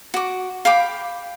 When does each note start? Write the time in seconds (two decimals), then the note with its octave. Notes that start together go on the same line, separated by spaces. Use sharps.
0.14 F#4 D6
0.65 F5 G5 B5 D6